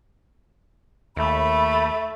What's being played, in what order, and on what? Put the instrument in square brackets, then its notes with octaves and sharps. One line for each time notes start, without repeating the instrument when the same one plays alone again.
[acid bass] D#2 [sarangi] A3 [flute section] B5